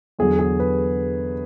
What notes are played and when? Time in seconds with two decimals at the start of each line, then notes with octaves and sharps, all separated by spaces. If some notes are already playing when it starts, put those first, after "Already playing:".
0.19 E2 D3 F#3 G#4
0.39 G#4
0.60 B4